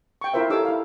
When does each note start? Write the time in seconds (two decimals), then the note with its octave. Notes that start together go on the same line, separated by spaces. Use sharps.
0.21 G5 C#6
0.34 E4 F4 A#4 C5 E5
0.50 D#4 G4 A4 C#5 D6 E6
0.65 E4 F5